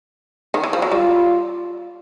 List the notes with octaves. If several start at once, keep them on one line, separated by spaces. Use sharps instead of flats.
D#3
E3
F3
F#3
G3 F4